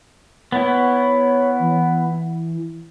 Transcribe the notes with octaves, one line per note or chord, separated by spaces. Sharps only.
B3 E4 C#5
E3